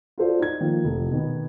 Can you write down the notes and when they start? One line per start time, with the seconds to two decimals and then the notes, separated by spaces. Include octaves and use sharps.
0.18 F4 F#4 A4 C5 D5
0.39 D#4 G#6
0.61 D#3 F3 A#3
0.85 F1
1.12 B2 D#3 B3